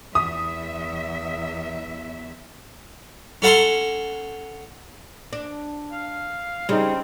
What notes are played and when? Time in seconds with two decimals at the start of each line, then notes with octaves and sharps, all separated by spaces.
0.15 E2 E5 D#6
3.42 C#4 A4 F#5 A#5 C6
5.33 D4
5.92 F5
6.69 C#3 G3 C4 D#4